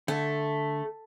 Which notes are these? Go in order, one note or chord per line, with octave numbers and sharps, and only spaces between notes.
D3 A3